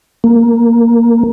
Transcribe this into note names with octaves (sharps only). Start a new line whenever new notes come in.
A#3